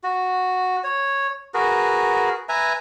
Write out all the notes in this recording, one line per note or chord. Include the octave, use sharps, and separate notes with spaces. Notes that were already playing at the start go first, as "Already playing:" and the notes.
F#4
C#5
F#4 G#4 A#4 B4
B4 E5 G#5 A#5